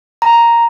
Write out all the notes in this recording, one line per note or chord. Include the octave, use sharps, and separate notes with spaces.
A#5